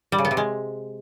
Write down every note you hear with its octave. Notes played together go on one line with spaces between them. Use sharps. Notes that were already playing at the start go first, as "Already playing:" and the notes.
G3
C#3
B3
C3
G#3